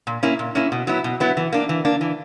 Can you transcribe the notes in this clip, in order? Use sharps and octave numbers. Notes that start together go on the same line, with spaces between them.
A#2
A#3 C#4 E4
A#2
A#3 C#4 E4
B2
F#3 B3 E4
B2
F#3 B3 E4
E3
A#3 D4
E3
A#3 D4
E3